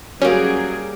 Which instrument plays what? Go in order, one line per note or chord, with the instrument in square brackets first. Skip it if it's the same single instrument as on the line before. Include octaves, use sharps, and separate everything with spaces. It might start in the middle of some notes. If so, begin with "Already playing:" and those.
[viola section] F#3 G#4 [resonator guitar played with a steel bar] G3 A#3 [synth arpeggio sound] C#4